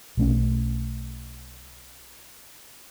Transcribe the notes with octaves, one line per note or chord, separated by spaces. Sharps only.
B1 A3 C#4